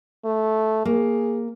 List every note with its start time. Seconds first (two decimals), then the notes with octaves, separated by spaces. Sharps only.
0.25 A3
0.85 A#3 G#4